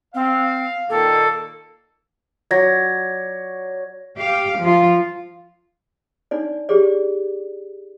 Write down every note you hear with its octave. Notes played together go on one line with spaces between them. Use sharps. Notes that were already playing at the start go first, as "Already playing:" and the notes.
C4 F5
A#2 D#3 A#3 A4
F#3 D5 G#6 A#6
G4 F5
F3 F4
D4 D#4 D5
G4 G#4 D5